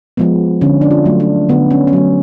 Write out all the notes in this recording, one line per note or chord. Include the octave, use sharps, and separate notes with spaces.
F3 G#3 B3
D3 C#4
D4
F4
F#3 A3
D4
D3 B3
C#4
C#4
F#3 A3 B3